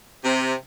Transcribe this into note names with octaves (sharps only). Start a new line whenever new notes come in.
C3